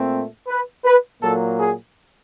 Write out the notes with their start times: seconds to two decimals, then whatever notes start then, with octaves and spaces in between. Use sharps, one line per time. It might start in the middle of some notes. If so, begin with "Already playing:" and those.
Already playing: A#2 A3 C4
0.47 B4
0.84 B4
1.21 A#2 F#3 A#3 A4
1.59 G#4